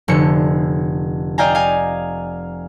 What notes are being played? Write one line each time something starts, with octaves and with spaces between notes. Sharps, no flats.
F1 D3 C#7
D5 D#5 F5 G5 G#5 A#5
F5 G#5